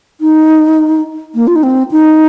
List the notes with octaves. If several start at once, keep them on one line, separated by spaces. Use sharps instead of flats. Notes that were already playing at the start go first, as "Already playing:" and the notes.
D#4
A#3
F4
D#4
C4
D#4